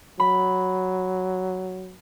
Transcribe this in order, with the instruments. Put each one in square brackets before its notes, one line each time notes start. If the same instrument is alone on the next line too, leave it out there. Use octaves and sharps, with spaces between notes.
[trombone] F#3 [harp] B5